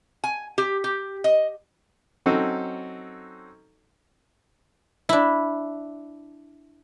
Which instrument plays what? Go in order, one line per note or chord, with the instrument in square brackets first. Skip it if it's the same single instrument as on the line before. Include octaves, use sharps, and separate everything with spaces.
[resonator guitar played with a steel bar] G#5
G4
G4
D#5
[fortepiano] F#3 C4 C#4 D#4 F#4 A4
[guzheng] D4 E4